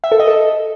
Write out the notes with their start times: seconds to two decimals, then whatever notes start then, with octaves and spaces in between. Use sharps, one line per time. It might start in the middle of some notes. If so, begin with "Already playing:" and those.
0.04 E5
0.12 A4
0.20 D#5
0.27 A4